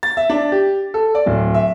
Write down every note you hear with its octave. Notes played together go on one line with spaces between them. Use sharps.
A6
E5
D4
G4
A4
D5
D1
E5